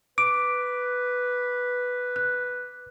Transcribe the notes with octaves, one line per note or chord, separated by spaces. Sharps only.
B4 D6 D7
F#6